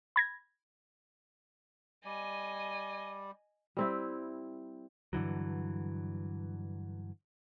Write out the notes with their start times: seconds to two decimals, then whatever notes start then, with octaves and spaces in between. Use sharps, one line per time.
0.16 B5 G#6 A#6
2.05 G3 D5 D#5 G#5
3.77 G3 C4 E4
5.13 G2 D3 E3 F#3